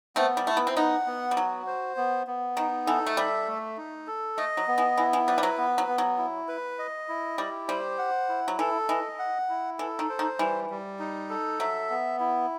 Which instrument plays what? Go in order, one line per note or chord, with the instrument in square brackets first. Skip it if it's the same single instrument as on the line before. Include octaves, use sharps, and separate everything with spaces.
[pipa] A3 C4 [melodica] B3
[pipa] G3
[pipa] A3 [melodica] E4
[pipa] B3
C4
[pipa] B3 D#4 [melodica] F#5
[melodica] B3
[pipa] G3
[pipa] F#3 [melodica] F#4
[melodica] C5
B3
B3
[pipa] D#3 [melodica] D#4
[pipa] E3 [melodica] A4
[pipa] A3
[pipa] G3 [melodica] E5
[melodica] A3
D#4
A4
[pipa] A3 [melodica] D#5
[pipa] F#3
[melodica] B3
[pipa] E3
[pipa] E3 [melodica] E4
[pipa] E3
[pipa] G3 [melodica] B4
[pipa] G3
F#3
[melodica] B3
[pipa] F#3
[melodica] B3
[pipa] F#3
[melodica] E4
B4
D#5
E4
[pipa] G3 [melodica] G4
[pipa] G3 [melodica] C5
[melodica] F#5
E4
[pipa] F#3
[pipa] E3 [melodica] A4
[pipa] E3 [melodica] D#5
[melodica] F#5
E4
[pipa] E3 [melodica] A4
[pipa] D#3
[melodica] C5
[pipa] D#3
[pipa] E3 [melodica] G3
[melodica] G3
D#4
A4
[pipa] F#3 [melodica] E5
[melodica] B3
E4